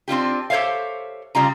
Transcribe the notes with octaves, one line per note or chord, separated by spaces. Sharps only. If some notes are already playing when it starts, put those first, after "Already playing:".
C4 D4 F4 G4
G4 A4 C5 C#5 E5 F5
C#3 G3 F4 A#5